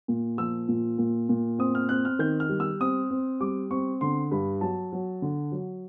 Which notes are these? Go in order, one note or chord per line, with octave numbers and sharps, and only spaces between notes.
A#2
F3 E6
A#2
A#2
A#2
C4 D#6
F6
C4 F#6
F6
D#3 G6
F6
G3
E6
C4 D#6
C4
G3 D6
C4 C#6
D3 C6
G2 B5
F#3 A5
F#3
D3
F#3